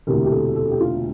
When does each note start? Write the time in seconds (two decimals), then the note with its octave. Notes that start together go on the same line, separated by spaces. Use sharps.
0.07 E1 D2 C3 E3 A#4
0.25 G4
0.31 A4
0.55 A4
0.71 G4
0.81 F4